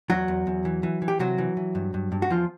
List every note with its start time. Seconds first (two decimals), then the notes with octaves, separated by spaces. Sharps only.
0.10 E2 F#3 F#4
0.28 E2
0.47 E2
0.65 E3
0.83 E3
1.02 E3
1.08 G4
1.19 C3 F#3 F#4
1.38 E3
1.57 E3
1.75 G2
1.94 G2
2.12 G2
2.22 F#4
2.30 E2 F3 F4